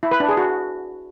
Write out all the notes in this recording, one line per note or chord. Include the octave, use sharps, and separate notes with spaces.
E4
B4
D4
G#4
F#4